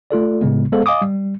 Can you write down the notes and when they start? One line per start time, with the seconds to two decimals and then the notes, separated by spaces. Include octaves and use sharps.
0.11 A3 F4 A4 D5
0.41 A2 C#3 G#3 B3
0.72 G#3 B3 A4 C5 F5
0.86 D#5 F5 G#5 D6 D#6
1.02 G3